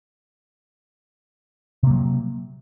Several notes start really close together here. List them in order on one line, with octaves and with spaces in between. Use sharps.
C3 A#3 F#3